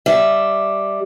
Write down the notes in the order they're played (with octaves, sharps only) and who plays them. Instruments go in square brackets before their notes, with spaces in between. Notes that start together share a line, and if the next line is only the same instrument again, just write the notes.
[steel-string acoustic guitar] G3 E5